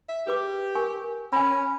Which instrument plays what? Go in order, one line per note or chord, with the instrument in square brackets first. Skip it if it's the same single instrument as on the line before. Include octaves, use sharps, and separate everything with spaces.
[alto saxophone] E5
[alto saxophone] G4 [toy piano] G#4 B4 D6
[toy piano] A#4 G#5 C#6
[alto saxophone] C#4 [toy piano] G#5 B5